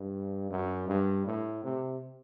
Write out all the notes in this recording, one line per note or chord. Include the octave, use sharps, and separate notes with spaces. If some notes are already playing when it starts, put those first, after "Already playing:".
Already playing: G2
F#2
G2
A2
C3